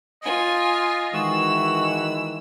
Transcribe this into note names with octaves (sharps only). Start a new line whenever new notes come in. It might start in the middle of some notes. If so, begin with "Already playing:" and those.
F4 D#5 G#5
D#3 E3 G#3 F#4 E6